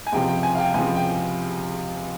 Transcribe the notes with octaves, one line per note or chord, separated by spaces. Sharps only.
G#5
C#2 C3 F3 G5
G5
G#5
F5
G5
C#2 C3 F3 G#5
G5